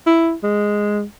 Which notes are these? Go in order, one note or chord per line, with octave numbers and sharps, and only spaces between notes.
E4
G#3